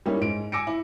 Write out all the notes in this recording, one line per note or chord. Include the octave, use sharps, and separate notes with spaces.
G3 A#3 C#4 D#4 E4
G#2 D7
G#5 D6 E6 A#6 C#7 D7
E4